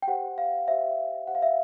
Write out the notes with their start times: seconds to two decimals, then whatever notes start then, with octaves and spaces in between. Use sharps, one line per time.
0.02 G5
0.08 G4 C5 F#5
0.38 F5
0.68 G4 C5 E5
1.27 G4 C5 F#5
1.35 F5
1.42 E5